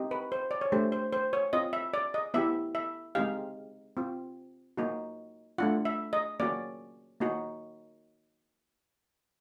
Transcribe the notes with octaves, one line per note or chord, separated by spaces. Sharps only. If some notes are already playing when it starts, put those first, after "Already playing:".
Already playing: C4 D#4 G4
B4
C5
D5
C#5
A3 D4 G4 C5
C5
C5
C#5
C4 F4 D#5
E5
D5
D#5
B3 E4 G4 E5
E5
G#3 C4 D#4 G4 F5
C4 F4
A#3 D#4 F#4
A3 D4 F4 F#5
E5
D#5
A#3 C#4 F#4 D5
A#3 D#4 F#4